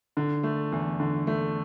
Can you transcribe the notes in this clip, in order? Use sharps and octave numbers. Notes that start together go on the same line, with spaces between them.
D3
A3
E2
D3
A3